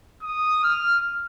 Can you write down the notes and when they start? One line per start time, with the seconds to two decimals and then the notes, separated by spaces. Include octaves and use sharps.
0.23 D#6
0.63 F6